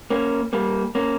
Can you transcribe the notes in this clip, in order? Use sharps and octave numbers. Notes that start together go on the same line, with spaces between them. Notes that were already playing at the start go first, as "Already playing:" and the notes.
A#3 C#4
G3 A#3
A#3 C#4